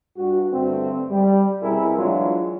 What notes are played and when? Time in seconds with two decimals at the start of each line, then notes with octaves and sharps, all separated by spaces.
0.17 G2 F#4
0.51 G2 D3 A3 C4
1.10 G3
1.62 C2 B2 E4 G#4 A#4
1.97 E3 F#3 G#3 D4 F4